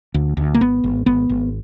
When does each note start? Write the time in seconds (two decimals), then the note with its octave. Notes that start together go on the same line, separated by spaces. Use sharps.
0.14 D2
0.37 D2
0.54 A#3
0.61 G#1 B3
0.84 G#1
1.06 G#1 B3
1.29 G#1